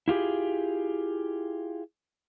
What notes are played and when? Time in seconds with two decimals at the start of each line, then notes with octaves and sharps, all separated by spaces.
0.08 E4 F4 G4 G#4